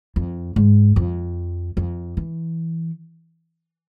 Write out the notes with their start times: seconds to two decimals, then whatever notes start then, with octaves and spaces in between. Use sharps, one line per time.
0.16 F2
0.56 G#2
0.96 F2
1.77 F2
2.17 E3